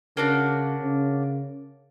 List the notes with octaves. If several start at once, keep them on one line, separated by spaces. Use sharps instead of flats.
C#3 A#3 D4 F#4
C#3